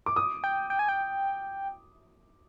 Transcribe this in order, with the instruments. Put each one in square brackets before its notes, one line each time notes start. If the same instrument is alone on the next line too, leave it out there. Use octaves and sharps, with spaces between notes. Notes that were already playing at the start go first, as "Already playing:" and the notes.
[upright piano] D6
D#6
[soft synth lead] G5
G5
G#5
G5